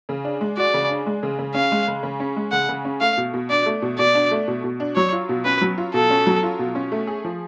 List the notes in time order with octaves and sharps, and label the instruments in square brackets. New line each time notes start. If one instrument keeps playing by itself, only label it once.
[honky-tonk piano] C#3
D4
G#3
[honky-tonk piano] F#4 [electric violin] D5
[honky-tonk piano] C#3
D4
G#3
C#3
C#3
[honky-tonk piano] C#4 [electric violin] F5
[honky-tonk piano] G#3
C#3
C#3
C#4
G#3
[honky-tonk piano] C#3 [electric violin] F#5
[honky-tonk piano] C#3
C#4
[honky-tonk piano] A3 [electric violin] F5
[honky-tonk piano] B2
B2
[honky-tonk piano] D4 [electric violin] D5
[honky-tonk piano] A3
B2
[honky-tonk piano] B2 [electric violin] D5
[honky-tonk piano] D4
A3
B2
B2
D4
[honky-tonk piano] F#3 [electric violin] C#5
[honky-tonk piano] F4
B2
[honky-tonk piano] C#4 [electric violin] B4
[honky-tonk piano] F#3
F4
[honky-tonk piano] B2 [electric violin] A4
[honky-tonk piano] C#4
F#3
F4
B2
C#4
A3
G#4
F3